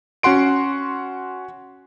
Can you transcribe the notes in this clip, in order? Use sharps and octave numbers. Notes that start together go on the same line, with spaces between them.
C#4 F#4 F#5 C6 D7